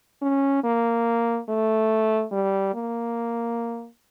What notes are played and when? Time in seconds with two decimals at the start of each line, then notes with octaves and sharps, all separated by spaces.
0.21 C#4
0.63 A#3
1.49 A3
2.32 G3
2.74 A#3